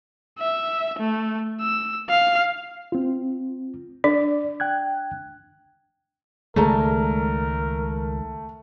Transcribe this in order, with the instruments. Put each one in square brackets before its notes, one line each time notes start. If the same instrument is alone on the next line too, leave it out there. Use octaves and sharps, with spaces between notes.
[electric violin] E5
A3
E6
F5
[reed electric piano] C4 F4
[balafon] D4 [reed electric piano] D5
[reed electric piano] G5 F#6 G#6
[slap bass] C#2 D#3 G#3 [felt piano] A3 [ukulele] G#4 D5 A#5 [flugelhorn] A#4